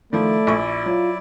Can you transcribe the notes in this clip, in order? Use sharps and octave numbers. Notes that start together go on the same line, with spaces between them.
D#3 F3 A3 E4 D5
A#1 C#6
F#3 F4